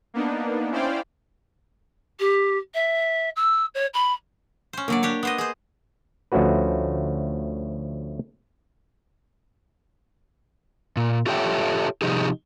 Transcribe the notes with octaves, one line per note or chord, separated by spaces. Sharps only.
A#3 B3 D4 D#4
C#4 E4 C5 D5 F5 G5
G4
E5
E6
C#5
B5
C#4 C5
D3 F#3 A#3 D5
D4 G4 C#5
B3 C5 D#5
G#4 C5
D2 F3 A3 C#4 F#4 B4
A#2
F4 G4 A4 C#5 E5 G5
C3 F3 D#4 G4 G#4